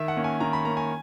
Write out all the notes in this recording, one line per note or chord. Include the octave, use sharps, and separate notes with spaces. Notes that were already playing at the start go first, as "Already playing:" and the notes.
Already playing: D#3 E5
F#5
A#3 C#4
G#5
D#3 A#5
B5
A#3 C#4 A#5
G#5